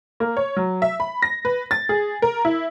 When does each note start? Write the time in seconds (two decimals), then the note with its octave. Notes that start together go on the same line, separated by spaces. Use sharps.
0.20 A#3
0.37 C#5
0.56 F#3
0.82 E5
1.00 B5
1.22 A#6
1.45 B4
1.71 A6
1.89 G#4
2.22 A#4
2.45 E4